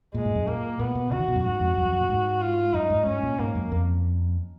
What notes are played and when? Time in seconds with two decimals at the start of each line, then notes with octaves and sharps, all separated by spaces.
0.14 A#2 G#3
0.25 G#2
0.35 F#2
0.47 A#2 A#3
0.79 A#2 B3
0.95 B2
1.11 C#3 F#4
1.19 D#3
1.28 B2
1.36 F#2
1.44 G#2 F#4
1.60 F2
1.77 F#2
1.85 F2
1.93 F#2
2.01 A#2
2.09 G#2
2.42 F4
2.74 F#2 D#4
2.90 G#2
3.06 G#2 C#4
3.23 A#2
3.39 G#2 A#3
3.55 F#2
3.72 F2